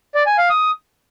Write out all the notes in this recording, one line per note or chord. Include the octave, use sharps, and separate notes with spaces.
D5
G#5
F5
D#6